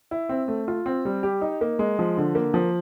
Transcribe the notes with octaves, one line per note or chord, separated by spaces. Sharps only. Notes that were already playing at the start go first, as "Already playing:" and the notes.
E4
C4
A3
F4
C4
G3
G4
D#4
A#3
G#3
F3
D3
A#3
F3